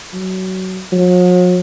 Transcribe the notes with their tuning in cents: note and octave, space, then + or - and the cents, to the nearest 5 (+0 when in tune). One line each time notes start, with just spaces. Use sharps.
F#3 +20
F#3 -45